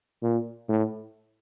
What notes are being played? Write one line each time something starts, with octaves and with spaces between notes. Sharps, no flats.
A#2
A2